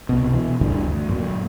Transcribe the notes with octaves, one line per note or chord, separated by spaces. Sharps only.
C2 B2
B2 E3
D2 G2 D3 E3
D2
F#2 A#2